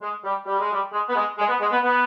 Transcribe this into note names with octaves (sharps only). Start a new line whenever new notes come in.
G#3
G3
G3
G#3
G3
G#3
B3
G#3
G#3
B3
G#3
B3
B3